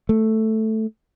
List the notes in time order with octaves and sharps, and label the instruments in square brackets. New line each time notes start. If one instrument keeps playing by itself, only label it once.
[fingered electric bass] A3